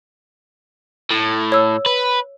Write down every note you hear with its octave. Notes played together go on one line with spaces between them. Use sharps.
A2
C#5 E6
B4